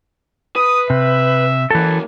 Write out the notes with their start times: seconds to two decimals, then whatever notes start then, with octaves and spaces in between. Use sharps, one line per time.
0.56 B4 D#6
0.90 C3 E5
1.71 F#2 E3 A#3 A4